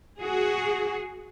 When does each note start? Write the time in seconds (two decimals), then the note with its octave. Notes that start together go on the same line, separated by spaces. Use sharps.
0.20 F#4 G#4